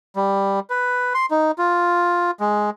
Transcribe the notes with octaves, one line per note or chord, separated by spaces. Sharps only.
G3
B4
C6
D#4
F4
G#3